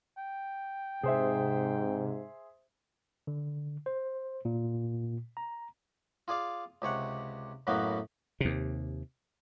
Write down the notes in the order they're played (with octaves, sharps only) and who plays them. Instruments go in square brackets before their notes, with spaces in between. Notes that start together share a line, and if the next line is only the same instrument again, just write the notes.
[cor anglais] G5
[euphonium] G#2 [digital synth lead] C3 [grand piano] G#4 C5 E5
[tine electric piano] D3
C5
A#2
A#5
[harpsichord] F4 G#4 D5 F5
C#2 C3 C#5 F#5
F#2 A2 F#3 A#3 B3
[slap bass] D#2 C3